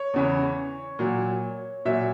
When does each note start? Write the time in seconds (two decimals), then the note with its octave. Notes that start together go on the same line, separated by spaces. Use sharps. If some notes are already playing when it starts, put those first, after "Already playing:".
Already playing: C#5
0.14 E2 C#3 E3
0.99 A#2 F#3
1.85 A#2 F#3 E5